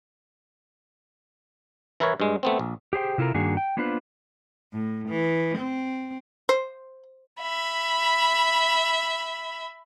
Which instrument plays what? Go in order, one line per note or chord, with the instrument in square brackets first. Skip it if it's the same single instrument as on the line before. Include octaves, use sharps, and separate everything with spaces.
[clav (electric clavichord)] E3 E4 A#4 B4 C#5
G2 G#3
A3 B3 C4
A#1
[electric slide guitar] G4 G#4 C5 G5
C3 E4 F4 A4 A#4
G2 D#3 A#3 D4 F#4 G#4
G5
A#3 B3 D4 F4 B4 C5
[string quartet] A2
E3
C4
[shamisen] C5
[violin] E5 B5